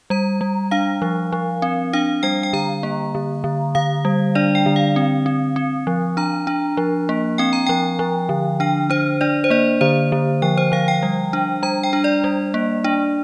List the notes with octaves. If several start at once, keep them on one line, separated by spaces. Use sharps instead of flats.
G3 A#5
G3
D4 F5
F3
F3
C4
D4 F5
G3 G5
G5
D3 A#5
A#3
D3
D3
D3 F5
G3
D4 D5
G5
D3
F5
C4
C4
C4
F3
D4 A#5
D4
F3
A#3
C4 G5
A#5
F3 G5
F3
D3
D4 G5
D4 C5
D4 D5
C5
A#3 D5
D3 C5
D3
F3 G5
C5
F3 F5
G5
G3
D4
G3 A#5
G5
D4
D5
G3
A#3
D4